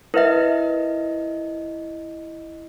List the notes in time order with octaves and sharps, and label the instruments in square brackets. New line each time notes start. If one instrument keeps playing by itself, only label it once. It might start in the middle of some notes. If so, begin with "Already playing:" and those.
[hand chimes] E4 D#5 [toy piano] A#4 B4 E5